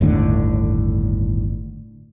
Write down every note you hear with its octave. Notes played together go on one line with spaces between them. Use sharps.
G1 D#2 A2 D3